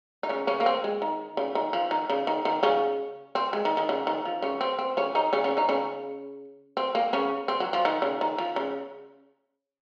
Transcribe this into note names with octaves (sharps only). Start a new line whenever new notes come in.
D#4
C#3 C#4
C#3 C#4
A#3
C4
G#3
D#3
C#3
D#3
F3
D#3
C#3
D#3
D#3
C#3 C#4
C4
G#3
D#3
D#3
C#3
D#3
F3
C#3 C#4
C4
C4
C#3 C#4
D#3 D#4
C#3 C#4
C#3 C#4
D#3 D#4
C#3 C#4
C4
A#3
C#3 C#4
C4
F#3
F3
D#3
C#3
D#3
F3
C#3